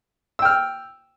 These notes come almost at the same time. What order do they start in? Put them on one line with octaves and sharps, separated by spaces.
E6 G5 F6